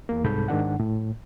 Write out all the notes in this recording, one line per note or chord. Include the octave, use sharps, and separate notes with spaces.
E2 A#3
C2 G#2 A4 B5 G6
G#2 D#3 D4 F#5
A2